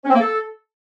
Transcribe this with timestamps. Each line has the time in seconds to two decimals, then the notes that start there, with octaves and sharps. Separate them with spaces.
0.04 C#4
0.09 C4
0.14 A#3
0.19 A4